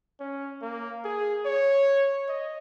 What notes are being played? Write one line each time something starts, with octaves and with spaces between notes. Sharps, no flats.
C#4
A#3
G#4
C#5
D#5